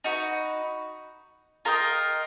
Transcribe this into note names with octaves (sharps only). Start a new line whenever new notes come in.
D#4 F#4 B4
F4 A#4 D#5 G5